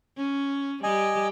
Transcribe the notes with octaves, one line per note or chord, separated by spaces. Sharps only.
C#4
G3 G4 D#5 G#5